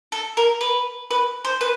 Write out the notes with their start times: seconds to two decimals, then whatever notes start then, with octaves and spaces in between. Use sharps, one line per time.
0.12 A4
0.37 A#4
0.61 B4
1.11 B4
1.45 C5
1.61 B4